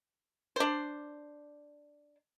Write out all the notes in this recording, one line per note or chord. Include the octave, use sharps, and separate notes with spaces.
D4 C5